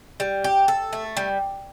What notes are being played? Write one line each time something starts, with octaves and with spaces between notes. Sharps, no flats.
G3
G4
A4
A3
G3